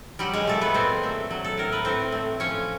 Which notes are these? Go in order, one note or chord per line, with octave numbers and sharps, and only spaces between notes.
F#3 G3 G4
G#3 G#4
A#2 A3 A4
B3 B4
A#2 C4 C5
A3
F#3
A4
A2 A#4
B4
A2 C4 C5
A3
F3 C#4 C#5